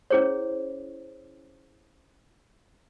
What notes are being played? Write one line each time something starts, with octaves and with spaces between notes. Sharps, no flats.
C#4 E4 G#4 C5 C#5